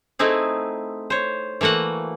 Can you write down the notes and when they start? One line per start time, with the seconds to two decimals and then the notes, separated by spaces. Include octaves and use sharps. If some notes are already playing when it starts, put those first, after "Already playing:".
0.19 A3 C4 D#4 E4 G#4
1.10 C5 C#5
1.61 E3 A3 A#3 F#4 F#5